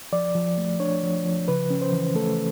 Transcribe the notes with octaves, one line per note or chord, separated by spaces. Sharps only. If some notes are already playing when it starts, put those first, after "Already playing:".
F3 D5
F3
A3
D4 C#5
F3
F3
C#3 B4
C#4
C5
E3
A3 A4